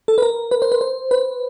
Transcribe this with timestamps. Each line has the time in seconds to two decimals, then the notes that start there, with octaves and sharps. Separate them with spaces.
0.08 A4
0.18 B4
0.22 A#4
0.51 B4
0.62 C5
0.72 B4
0.81 C5
1.11 B4